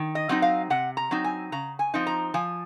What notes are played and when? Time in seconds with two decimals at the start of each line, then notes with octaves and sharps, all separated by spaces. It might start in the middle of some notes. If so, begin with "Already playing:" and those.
Already playing: D#3
0.15 D#5
0.29 F#3 C4 D#4
0.42 F5
0.70 C3 F#5
0.97 A#5
1.11 F#3 C4 D#4
1.24 G#5
1.52 C#3 A#5
1.79 G#5
1.94 F3 C4 D#4
2.07 A#5
2.34 F3 G#5